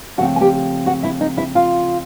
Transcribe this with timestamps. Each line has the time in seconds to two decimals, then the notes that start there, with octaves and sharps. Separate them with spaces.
0.17 C#3 F3 A3 C4 F#4 F#5
0.36 G#5
0.41 G4 G5
0.86 F#4 F#5
1.03 E4 E5
1.21 D#4 D#5
1.37 E4 E5
1.55 F4 F5